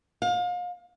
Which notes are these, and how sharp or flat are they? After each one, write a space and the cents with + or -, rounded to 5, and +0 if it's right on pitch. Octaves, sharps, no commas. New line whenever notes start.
F5 +35